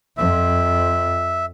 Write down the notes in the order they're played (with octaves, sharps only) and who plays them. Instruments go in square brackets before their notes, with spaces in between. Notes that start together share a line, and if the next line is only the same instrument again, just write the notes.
[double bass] F2 F3 [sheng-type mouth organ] E5